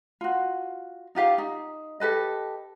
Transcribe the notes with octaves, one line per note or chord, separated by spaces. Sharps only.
F4 F#4
D#4 F4 G4 F5
D#4
G4 A4 B4 D#5